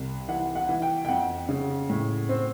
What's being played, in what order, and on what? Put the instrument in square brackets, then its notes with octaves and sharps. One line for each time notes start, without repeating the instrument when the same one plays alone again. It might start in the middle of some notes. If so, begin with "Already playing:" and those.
Already playing: [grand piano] C2
E3 F#5
F#5
E3
G5
G5
F2 F#5
C#3
A2
C4